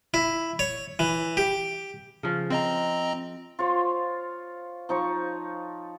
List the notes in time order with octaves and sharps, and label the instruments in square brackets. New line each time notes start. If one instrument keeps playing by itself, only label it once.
[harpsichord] E4
C#5
E3
G4
[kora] C#3 F3
[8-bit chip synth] C4 D#5 A#5 [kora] C5
[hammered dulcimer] F4 C5 C#5
F3 D#4 C#5 C#6